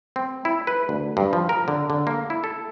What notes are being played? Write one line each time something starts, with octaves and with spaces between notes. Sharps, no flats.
C4
E4
B4
D2
G2
F3
A#4
D3
D3
A#3
E4
A4